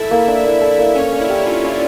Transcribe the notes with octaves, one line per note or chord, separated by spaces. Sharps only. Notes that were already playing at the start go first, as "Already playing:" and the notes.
Already playing: E4 A4 E5
A#3
D4
A#3
A4
A#3
C#4 C#5 D5
F5
E4
G4
E4
D4 F4
D5